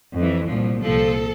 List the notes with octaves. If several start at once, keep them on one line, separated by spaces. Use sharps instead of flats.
F2 E3
C2 A#2 F3
C2 A#2 F3 A4